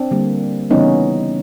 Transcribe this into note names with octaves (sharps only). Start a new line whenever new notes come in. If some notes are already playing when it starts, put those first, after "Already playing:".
Already playing: C4 D4
D3 G3 A#3
C#3 E3 G3 B3 C#4 D#4